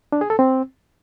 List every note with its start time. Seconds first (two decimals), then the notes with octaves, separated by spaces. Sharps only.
0.12 D4
0.21 G#4
0.30 A4
0.39 C4